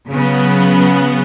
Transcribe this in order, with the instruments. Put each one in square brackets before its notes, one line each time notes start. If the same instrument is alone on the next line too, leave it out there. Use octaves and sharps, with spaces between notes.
[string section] C#3 F#3 B3